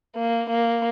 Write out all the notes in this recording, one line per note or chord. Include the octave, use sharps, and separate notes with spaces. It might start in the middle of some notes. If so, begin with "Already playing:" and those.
A#3
A#3